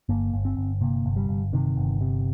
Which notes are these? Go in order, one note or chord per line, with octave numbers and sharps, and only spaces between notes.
G1 A#3
G1
C4
G1
C3 A#3
G1
G3
G1
C3 D#3
G1
C3